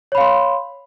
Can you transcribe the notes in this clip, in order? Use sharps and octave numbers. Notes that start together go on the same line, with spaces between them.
C#5 F5 B5 C6